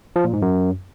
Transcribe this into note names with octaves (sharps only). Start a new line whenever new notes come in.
F3
A#2
G#2
F#2